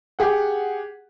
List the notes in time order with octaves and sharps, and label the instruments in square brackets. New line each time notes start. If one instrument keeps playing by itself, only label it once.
[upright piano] G4 G#4 F#5